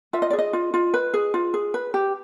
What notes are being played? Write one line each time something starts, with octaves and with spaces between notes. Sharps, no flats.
F4 E5
D#5
D5
G#4
D#5
F4
F4
B4
G#4
F4
G#4
B4
G4